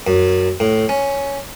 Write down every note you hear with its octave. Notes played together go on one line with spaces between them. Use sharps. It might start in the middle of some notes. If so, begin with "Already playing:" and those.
F#2
A2
C#4